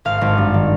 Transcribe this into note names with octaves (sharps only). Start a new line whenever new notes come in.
G#1 F5
G#1
G2
D#3